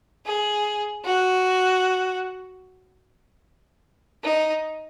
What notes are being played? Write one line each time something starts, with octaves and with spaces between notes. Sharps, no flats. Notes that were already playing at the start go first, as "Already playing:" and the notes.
G#4
F#4
D#4